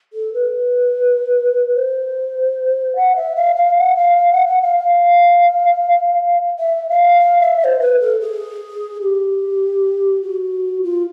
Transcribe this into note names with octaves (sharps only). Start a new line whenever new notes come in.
A4
B4
C5
F#5
E5
F5
F5
F#5
F5
F5
F#5
F#5
F5
F5
E5
F5
F5
E5
E5
C5
B4
A4
G#4
G4
F#4
F4